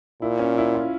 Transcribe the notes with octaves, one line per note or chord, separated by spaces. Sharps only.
A#2 E4
C#4
E4
F4